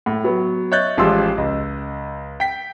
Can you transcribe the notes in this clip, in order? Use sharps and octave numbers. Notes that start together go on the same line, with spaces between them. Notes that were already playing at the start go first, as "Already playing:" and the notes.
A2
F#3 B3
C#5 D#5 E5 F#6 G6 A6
A1 F3 G#3 G4 C6 E6
C#2 D#5
G5 B6